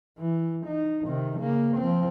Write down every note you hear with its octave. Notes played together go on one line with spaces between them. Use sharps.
E3
D#4
C3 D#3
C#3 A#3
F3 C4